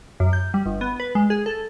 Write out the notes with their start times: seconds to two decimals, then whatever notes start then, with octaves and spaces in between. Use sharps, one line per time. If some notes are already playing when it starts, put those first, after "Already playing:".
0.20 F#2
0.33 G6
0.54 G3
0.66 G1
0.81 B3
1.00 B4
1.15 G#3
1.30 G#4
1.46 A4